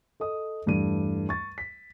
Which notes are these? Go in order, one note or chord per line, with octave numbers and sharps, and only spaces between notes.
A4 D#5 D#6
E2 G2 G3 A3 D#7
C#6 A6
B6